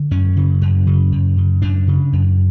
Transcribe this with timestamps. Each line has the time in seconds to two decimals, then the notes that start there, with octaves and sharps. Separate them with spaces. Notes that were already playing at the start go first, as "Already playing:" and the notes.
Already playing: D3
0.11 F#2 C#4
0.37 C#3
0.61 F#2
0.87 C#3
1.12 F#2
1.37 C#3
1.62 F#2 D4
1.87 C#3
2.13 F#2